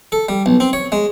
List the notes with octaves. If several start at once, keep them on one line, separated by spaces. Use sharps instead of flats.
A4
G3
B1
C4
C#5
G#3